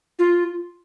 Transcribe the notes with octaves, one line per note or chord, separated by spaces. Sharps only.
F4